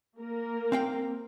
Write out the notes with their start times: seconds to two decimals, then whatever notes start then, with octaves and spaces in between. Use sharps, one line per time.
0.18 A#3 A#4
0.72 C4 F5 G5